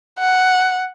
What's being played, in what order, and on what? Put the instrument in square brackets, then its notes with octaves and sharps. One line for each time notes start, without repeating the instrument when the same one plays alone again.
[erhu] F#5